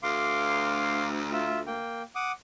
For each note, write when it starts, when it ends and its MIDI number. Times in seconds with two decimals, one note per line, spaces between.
0.03 1.76 38
0.03 1.07 77
0.03 1.07 84
0.03 1.07 86
1.32 1.60 65
1.32 1.60 76
1.67 2.02 58
1.67 2.02 79
2.15 2.32 78
2.15 2.32 86
2.15 2.32 87